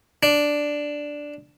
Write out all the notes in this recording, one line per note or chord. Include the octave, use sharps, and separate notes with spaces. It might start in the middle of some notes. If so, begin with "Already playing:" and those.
D4